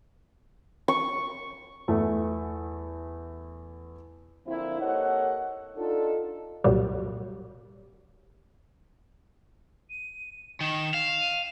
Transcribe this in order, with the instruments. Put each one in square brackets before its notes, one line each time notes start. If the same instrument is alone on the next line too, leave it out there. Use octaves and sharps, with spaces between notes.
[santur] C#6
[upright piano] E2 A3
[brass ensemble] D3 F3 A#3 C4 E4
A#3 G4 A4 C#5 D#5 F#5
D4 D#4 F4 A4
[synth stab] C2 F#2 A#2 F#3 G3
[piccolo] D#7
[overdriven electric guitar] D#3 [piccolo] E7
[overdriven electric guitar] F5
[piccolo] D#7